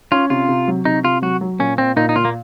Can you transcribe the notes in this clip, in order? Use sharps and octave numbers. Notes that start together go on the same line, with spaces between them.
C#4 F4
C3 F4
C3
F#3
C3 D#4
C3 F4
F#3 F#4
F#3
A#2 C#4
A#2 C4
A#2 D#4
D#4
A#2 F4
A#3